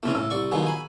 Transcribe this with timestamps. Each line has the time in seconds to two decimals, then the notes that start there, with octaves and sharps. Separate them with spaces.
0.03 A#2 C#3 E3 A3 C4 C#4
0.15 A2 E6
0.30 C2 D5 C#6
0.52 D#3 F3 F#3 B3 G#4
0.67 G#5 B5